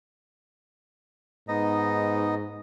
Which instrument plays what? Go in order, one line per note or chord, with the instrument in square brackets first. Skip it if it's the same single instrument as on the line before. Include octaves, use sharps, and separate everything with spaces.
[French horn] G#2 [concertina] B3 D#4 D#5